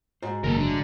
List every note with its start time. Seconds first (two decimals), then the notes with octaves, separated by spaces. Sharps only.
0.23 G#2 F#4 C5
0.44 F#1 D#3 A#3 A4 A#4
0.57 D3 F#3 A3